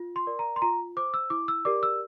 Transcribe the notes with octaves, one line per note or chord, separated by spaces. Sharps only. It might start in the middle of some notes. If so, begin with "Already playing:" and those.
Already playing: F4
C6
A#4 D5
A#5
C6
F4 A#5
C5 D6
E6
E4 D6
E6
G4 A#4 D5 D6
E6